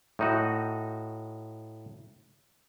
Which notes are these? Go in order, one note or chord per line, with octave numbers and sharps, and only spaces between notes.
A2 D#4 F#4